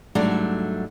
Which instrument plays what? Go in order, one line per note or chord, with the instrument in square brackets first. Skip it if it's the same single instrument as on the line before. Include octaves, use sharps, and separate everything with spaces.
[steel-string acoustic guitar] G#2 F#3 G3 A3 D4